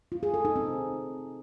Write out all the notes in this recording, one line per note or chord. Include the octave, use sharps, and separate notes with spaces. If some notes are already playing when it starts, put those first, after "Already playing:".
F4
G#4
A4
D#4
C4